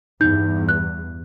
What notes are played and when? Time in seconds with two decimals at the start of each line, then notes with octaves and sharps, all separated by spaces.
0.21 E2 G2 D#4 G6
0.69 F#6